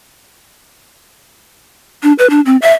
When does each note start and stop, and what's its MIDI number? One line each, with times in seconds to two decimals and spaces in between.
2.03 2.12 62
2.19 2.29 71
2.30 2.41 62
2.46 2.56 60
2.62 2.72 76